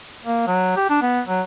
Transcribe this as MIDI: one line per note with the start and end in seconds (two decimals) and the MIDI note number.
0.25 0.43 58
0.47 0.73 54
0.76 0.87 67
0.90 1.00 62
1.02 1.20 59
1.28 1.42 54